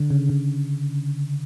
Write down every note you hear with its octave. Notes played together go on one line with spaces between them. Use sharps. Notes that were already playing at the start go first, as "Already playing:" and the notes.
Already playing: D3
C#3
C#3